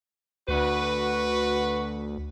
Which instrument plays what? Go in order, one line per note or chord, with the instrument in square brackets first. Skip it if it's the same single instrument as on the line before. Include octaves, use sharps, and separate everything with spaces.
[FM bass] D2 [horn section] F#4 B4